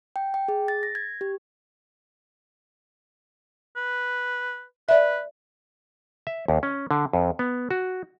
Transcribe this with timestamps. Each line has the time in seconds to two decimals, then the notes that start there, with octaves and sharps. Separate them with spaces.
0.16 G5
0.34 G5
0.48 G#4
0.68 A6
0.83 A#6
0.95 G#6
1.21 G4
3.76 B4
4.89 B4 D5 E5
6.27 E5
6.48 D#2
6.63 C#4
6.91 D3
7.13 F2
7.39 B3
7.71 F#4